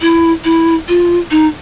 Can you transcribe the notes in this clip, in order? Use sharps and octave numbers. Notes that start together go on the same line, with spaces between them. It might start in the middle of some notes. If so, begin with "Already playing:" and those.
E4
E4
F4
D#4